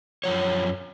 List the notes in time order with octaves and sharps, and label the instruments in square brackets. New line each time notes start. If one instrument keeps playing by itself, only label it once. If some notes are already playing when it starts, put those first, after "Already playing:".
[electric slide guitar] F#2 C#3 F3 C#5